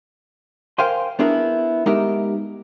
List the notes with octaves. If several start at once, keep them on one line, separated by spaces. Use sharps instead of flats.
A#4 C5 F5 G5 G#5 C6
B3 D4 E4 G#4 A#4
G#3 B3 D#4 G4 A#4 E5